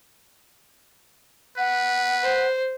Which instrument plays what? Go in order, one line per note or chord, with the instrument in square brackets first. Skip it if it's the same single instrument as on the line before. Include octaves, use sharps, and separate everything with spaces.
[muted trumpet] B4 [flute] F#5
[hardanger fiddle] C5